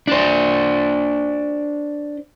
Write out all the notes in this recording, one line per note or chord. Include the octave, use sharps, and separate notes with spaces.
D4 C5